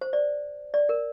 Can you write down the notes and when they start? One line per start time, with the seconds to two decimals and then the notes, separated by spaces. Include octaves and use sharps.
0.01 C5
0.13 D5
0.74 D5
0.89 A#4